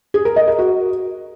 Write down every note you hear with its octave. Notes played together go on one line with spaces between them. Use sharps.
G#4
A#4
D#5
A#4
F#4